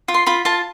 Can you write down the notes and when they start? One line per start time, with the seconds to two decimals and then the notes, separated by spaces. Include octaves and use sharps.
0.08 F4
0.14 C6
0.26 F4 B5
0.45 F4 A5